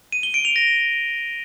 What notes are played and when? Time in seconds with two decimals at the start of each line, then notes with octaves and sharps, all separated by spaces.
0.12 D#7
0.23 G7
0.34 D7
0.45 F7
0.56 A#6